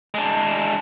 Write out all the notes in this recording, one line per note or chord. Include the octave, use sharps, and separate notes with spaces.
G#3 D4